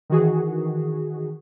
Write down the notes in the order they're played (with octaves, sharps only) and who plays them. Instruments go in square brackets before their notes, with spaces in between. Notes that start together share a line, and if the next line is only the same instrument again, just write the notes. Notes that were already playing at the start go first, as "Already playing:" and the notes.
[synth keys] D#3 E3 F#4 G#4